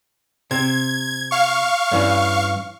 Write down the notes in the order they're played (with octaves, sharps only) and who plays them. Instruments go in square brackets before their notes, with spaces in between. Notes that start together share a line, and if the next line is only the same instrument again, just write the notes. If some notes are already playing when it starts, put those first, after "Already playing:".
[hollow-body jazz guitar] C3 [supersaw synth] G#6
[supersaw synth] F5 C#6
[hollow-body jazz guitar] G2 E3 C#4